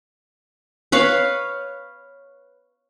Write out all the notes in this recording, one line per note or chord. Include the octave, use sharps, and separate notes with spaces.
B4 C#5 F5